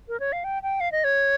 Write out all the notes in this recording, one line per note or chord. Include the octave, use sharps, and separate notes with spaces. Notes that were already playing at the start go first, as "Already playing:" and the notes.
A#4
C#5
F5
G5
G5
F5
D#5
C#5